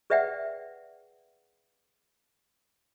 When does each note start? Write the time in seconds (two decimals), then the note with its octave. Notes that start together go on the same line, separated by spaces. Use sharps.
0.10 G#4 B4 D5 E5 F#5 G5